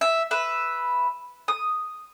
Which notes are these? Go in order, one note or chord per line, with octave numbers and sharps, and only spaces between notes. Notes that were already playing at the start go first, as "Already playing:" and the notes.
E5
B4 E5
D#6